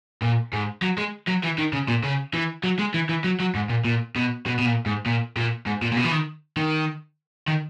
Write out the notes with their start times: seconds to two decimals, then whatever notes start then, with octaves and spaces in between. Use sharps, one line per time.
0.22 A#2
0.53 G#2
0.82 F#3
0.98 G#3
1.27 F#3
1.43 E3
1.58 D#3
1.73 C#3
1.88 A#2
2.04 C#3
2.34 E3
2.64 F#3
2.79 G#3
2.94 E3
3.09 E3
3.24 F#3
3.40 F#3
3.55 G#2
3.70 A#2
3.85 A#2
4.16 B2
4.46 B2
4.59 B2
4.65 A#2
4.86 G#2
5.06 A#2
5.36 A#2
5.66 G#2
5.82 A#2
5.92 A#2
5.97 B2
6.04 E3
6.11 D#3
6.57 D#3
7.48 D#3